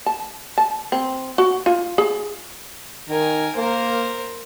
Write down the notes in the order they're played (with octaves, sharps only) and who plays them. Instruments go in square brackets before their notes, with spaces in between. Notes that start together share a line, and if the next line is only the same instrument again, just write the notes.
[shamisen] A5
A5
C4
F#4
F4
G#4
[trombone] D#3 [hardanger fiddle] A#4 G#5
[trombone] A#3 [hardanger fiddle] A#4 C5